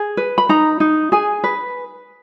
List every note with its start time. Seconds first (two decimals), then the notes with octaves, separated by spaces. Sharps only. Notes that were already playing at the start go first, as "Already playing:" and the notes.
Already playing: G#4
0.17 B4
0.38 B5
0.49 D#4 A#5
0.80 D#4
1.12 G#4 G#5
1.44 B4